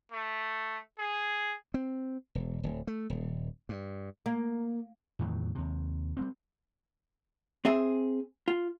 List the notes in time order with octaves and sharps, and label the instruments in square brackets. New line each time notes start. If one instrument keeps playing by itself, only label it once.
[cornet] A3
G#4
[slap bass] C4
E1
D1
A3
D#1
G2
[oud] A#3
[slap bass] E2 A2 D#3 F#3
D#2 C3
G3 A#3 C4
[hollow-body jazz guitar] C4 G#4 E5
F4